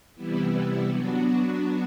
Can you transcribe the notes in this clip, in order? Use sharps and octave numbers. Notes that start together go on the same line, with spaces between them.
C3 E3 G3 B3 E4
F#3 B3 D4 F#4